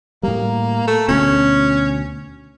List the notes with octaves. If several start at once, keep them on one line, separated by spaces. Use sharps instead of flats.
A2 G3 A#3
A3
D2 B2 C#4